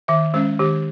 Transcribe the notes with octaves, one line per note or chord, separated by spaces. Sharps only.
D#3 E5
G#3 C#4 C5
D#3 G4